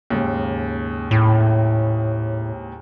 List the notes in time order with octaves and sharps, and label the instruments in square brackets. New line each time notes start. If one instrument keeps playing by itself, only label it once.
[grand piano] D#2 G#2 C#3
[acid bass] A2